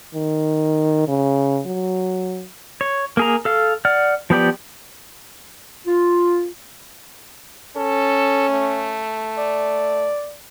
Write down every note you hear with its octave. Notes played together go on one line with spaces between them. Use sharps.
D#3
C#3
F#3
C#5
A#3 G#4 A#5
A4 F5
D5 F#5 F6
F3 B3 G4 D5
F4
C#4 A4
A3
D5